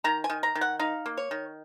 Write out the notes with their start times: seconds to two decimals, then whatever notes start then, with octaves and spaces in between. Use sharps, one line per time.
0.04 D#3 A#5
0.24 G#5
0.30 D#3
0.43 A#5
0.55 D#3
0.61 F#5
0.79 D#4 F5
1.06 A#3
1.17 C#5
1.31 D#3